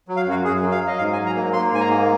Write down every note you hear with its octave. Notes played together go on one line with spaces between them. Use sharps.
F#3
F5
F#2 F#4
F#2 G#4
F#3
F5
F#3
D#5
G#2 F5
G#5
F#3
A#5
A#3
A#3 C6
G#2 G#5
A#5
A#3